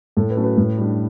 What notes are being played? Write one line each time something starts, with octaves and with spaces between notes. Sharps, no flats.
A2 A4
B4
F#3 A3 C#4
B4
A2
G3 D4